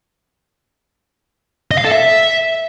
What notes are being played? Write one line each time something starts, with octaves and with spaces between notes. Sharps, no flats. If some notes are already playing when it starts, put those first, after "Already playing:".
D#5
F5
A4
E5